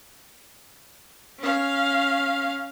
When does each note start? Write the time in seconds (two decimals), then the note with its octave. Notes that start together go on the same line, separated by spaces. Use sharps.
1.39 C#4 F5